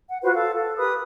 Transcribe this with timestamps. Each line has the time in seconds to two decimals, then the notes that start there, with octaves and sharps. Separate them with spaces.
0.09 F#5
0.23 F4 F#4 B4 C5
0.34 A4 F5
0.55 A4
0.77 G4 A#4 B4 D#6